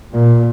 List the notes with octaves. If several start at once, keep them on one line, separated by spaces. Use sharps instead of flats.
A#2